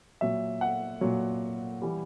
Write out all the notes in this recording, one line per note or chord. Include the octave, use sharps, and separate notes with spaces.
A#2 F#3 E5
F#5
A#2 F#3
E3 G3